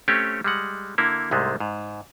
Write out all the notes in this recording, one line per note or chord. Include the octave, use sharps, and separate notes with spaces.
A3 C4 C#4 G4 C#5
G3 G#3 F#5
D3 A#3 E4
C2 G#2 C3 G#3 A3
G#2